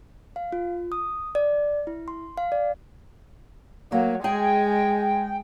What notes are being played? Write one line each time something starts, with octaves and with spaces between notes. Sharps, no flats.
F5
F4
D#6
D5
E4
C6
F5
D5
F#3 A#3
G#3 G#4 G5